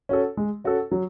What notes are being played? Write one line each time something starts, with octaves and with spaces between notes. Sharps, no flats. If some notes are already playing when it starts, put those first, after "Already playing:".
C#4 F#4 A4
G#3
C#4 F#4 A4
F#3